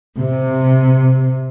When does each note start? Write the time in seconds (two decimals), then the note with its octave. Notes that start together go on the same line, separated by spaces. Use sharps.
0.17 C3